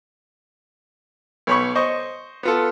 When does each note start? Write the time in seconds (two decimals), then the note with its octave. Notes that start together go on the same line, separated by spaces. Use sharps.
1.47 B1 C#5 B5 C#6
1.75 C5 D#5 C#6
2.43 B3 F4 A4